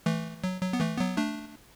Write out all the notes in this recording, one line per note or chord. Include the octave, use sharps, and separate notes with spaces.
E3 A3
F#3
F#3
B3
E3 A3
F#3 B3
A3 D4